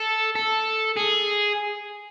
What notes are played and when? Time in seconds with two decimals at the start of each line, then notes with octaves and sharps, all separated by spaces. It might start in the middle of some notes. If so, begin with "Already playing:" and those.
Already playing: A4
0.35 A4
0.97 G#4